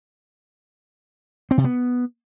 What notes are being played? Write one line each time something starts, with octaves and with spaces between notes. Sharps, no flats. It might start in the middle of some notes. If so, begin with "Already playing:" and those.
C4
C3
B3